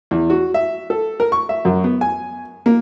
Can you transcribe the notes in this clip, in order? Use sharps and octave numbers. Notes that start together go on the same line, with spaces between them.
E2
F#4
E5
A4
A#4
C#6
E5
F#2
B3
G#5
A#3